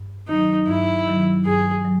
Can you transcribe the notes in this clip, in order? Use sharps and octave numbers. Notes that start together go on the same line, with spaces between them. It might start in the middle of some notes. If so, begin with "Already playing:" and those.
Already playing: G2
D#3 F#3 D#4
G2 E4
D#3 F#3
G2 G#4
F#3